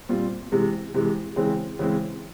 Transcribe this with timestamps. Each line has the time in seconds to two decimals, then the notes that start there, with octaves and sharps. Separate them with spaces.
0.09 A#2 G3 C4 F4
0.52 C3 E3 G#3
0.94 C3 E3 G#3
1.36 C#3 E3 G#3 C4
1.79 C#3 E3 G#3 C4